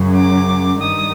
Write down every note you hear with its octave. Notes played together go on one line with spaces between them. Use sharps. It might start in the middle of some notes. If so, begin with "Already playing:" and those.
Already playing: F#2 C#3 F#3
D6
G2 D#3 G3 D#6